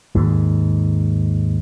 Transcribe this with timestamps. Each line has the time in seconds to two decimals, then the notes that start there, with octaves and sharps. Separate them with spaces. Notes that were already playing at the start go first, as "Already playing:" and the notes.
0.15 D#2 G#2